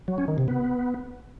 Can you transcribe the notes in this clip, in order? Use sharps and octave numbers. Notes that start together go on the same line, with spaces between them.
F#3
C#4
D#3
C3
B3